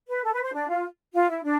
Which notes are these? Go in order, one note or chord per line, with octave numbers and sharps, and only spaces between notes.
B4
A4
B4
C5
D4
F4
F4
E4
D4